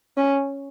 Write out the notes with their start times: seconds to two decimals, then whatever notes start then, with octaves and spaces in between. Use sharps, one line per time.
0.17 C#4